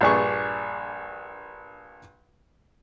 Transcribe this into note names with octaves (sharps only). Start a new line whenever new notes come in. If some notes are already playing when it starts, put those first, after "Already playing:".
A#1 G2 D4 G#4 C#6